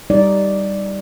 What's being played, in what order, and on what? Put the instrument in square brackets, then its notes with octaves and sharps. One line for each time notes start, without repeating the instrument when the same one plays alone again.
[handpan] G3 D#4 D5